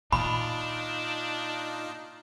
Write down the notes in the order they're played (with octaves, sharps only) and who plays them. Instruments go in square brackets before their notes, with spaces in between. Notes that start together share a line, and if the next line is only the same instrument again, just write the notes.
[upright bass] A#2 [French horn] D4 [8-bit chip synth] D#4 F4 [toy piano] B5